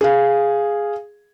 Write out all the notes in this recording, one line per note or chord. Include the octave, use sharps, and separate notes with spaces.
G#4 F5